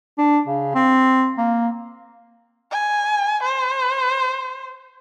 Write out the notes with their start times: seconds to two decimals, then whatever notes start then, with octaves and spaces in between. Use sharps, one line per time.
0.18 D4
0.47 C#3
0.75 C4
1.38 A#3
2.72 G#5
3.43 C5